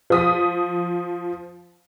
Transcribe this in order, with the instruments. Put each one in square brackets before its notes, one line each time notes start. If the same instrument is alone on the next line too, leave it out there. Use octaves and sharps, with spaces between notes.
[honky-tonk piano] F3 D#6 B6